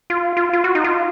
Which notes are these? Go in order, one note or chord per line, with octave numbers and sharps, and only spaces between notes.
F4
F4
F4
F#4
D#4
F4